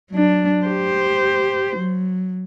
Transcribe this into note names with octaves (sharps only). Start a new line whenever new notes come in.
F#3 D4
G4 C5
F#3